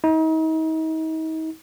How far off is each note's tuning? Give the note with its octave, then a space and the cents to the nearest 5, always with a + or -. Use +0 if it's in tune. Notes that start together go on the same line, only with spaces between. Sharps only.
D#4 +40